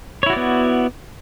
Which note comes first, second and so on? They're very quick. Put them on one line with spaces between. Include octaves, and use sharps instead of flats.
C#5 E4 F#4 D5 B3